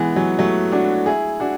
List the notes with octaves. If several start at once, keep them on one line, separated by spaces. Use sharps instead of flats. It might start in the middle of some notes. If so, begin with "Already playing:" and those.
Already playing: E3 G#3 B3
F#3
F#3 A3
D4 F#4
E4 G#4
D4 F#4